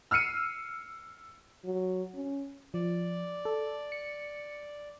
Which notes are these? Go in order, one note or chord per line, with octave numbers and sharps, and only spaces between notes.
E6 F6 C7 C#7 D#7
F#3
C#4
F3 D5
A4
C#7